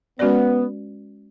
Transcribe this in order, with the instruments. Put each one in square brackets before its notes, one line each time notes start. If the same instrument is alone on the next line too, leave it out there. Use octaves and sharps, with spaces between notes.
[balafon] G#3 C#4 F#4 B4 D5 [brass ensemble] B3